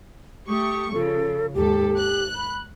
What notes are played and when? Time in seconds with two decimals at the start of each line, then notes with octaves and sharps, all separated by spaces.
0.49 A3 G4 C#6 D#6
0.93 C#3 F3 A4
1.54 D#2 G#2 G4 A4
1.97 F#6
2.35 B5